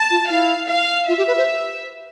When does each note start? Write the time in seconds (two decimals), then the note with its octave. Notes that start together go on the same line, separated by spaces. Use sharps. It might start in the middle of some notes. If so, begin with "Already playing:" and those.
Already playing: A5
0.10 F4
0.30 E4 F5
0.69 F5
1.08 F4 E5
1.18 G4
1.27 B4
1.38 C5